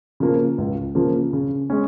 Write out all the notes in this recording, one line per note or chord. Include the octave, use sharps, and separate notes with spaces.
C#3 F3 A#3
C#2
C#3 F3 A#3
C#3
G#3 C#4